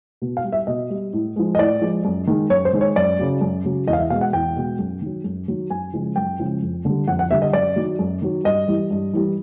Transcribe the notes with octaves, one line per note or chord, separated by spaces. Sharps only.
B2
F5
G3
E5
B2 D#5
G3
A2
F3 G#3
D#5
A2 D5
F3 G#3
F#2
D#3 G#3
F#2 C#5
C5
D#3 G#3
C#5
F#2 D5
C#3 F#3
F#2
C#3 F#3
E2 D#5
F5
E5
B2 G#3 F5
F#5
E2 G5
B2 G#3
F#2
D#3 F#3
F#2
D#3 F#3
F#2 G#5
C#3 F3 G#3
F#2 G5
C#3 F3 G#3
F2
D3 G3
F2 F#5
F#5
D3 G3 E5
D#5
F#2 D5
D#3 F#3
F#2
D#3 F#3
G2 D#5
E3 G3
G2
E3 G3